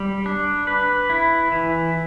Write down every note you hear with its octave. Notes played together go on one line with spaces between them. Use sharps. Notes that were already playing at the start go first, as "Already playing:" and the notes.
Already playing: G3
D4
B4
E4
E3